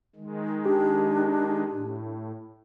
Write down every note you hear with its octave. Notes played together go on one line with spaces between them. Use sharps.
D#3 G#3
D4 G4
A2